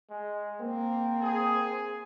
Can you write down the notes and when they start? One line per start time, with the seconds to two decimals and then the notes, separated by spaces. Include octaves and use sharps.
0.10 G#3
0.61 A#3 C4
1.22 G#4